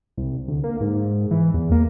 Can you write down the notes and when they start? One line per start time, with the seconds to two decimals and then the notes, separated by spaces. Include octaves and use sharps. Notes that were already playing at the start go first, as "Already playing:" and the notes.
0.17 C2
0.48 D2
0.64 A#3
0.81 G#2
1.31 E3
1.54 E2
1.72 A#3